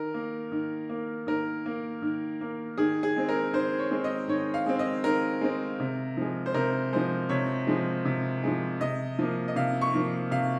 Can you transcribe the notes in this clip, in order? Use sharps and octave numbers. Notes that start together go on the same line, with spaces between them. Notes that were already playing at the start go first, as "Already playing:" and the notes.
Already playing: D#3 A#4
A#3
D#3
A#3
D#3 A#4
A#3
D#3
A#3
D#3 G#4
G#4
G#3 C4
A#4
D#3 C5
C#5
G#3 C4
D#5
D#3 C#5
F5
G#3 C4
D#5
D#3 A#4
G#3 C4
C3
F3 G#3
C5
C3 A#4
F3 G#3 C5
C3 C#5
F3 G#3
C3
F3 G#3
C3 D#5
F3 A#3
D#5
C3 F5
C#6
F3 A#3
C3 F5